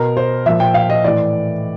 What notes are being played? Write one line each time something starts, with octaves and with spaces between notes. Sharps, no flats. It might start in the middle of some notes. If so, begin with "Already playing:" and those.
Already playing: B2 A#4
C5
A#2 F3 E5
G5
F5
D#5
A2 E3 D5